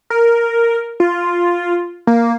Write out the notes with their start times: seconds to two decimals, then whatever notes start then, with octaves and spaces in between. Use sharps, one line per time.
0.10 A#4
1.00 F4
2.07 A#3